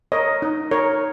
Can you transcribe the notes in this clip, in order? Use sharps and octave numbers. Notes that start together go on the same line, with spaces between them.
A#4 C#5 D#5
D#4
A#4 C#5